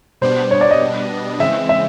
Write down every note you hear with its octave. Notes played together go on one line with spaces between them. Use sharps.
B2 G3 B3 D4 C5
C#5
D5
D#5
C#3 E3 G#3 C4 E5
E5